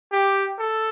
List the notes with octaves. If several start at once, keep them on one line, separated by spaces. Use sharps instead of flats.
G4
A4